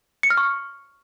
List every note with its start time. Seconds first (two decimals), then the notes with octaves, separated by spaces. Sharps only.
0.23 C#7
0.30 F6
0.37 C#6